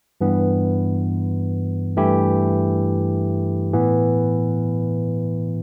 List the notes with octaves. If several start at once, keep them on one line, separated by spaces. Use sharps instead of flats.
G2 E3 B3
G2 E3 A3 E4 G4
A2 E3 B3